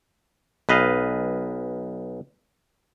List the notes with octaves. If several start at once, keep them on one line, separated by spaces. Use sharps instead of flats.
B1 B4 D#5 F5